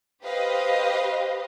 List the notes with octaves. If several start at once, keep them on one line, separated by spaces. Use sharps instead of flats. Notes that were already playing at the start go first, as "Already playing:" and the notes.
G4 B4 C5 D#5 F5